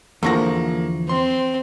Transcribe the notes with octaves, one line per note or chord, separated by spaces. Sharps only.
E2 D3 F3 A#3 C#6 A#6
C4 C6